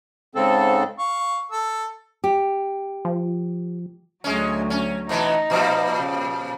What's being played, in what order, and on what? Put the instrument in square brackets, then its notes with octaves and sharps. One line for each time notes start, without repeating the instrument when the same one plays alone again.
[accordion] G#2 C#3 C4 A4
[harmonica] F5 C#6
A4 E6
[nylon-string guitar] G4
[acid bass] F3
[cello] D2 F#3 [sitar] G#3 C#4
[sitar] C#4
[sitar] B2 E3 B3 [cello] D#4
[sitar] A#2 F3 G3
[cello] C#3